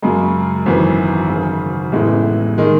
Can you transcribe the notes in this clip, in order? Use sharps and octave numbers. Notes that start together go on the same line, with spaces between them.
F#2 C#3 G#3
G#1 F#2 E3
G#1 F#2 C#3
A1 A2 G#3 B3 E4
D#3 G#3